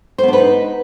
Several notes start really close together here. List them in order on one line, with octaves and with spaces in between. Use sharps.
C5 B3 D4 B4 D#4